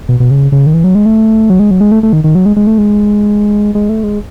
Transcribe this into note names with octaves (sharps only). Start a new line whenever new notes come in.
B2
B2
C#3
C#3
D#3
E3
F#3
G#3
A3
F#3
G#3
F#3
G#3
A3
A3
D#3
D#3
F#3
G#3
G#3
A3
G#3
G#3
A3
G#3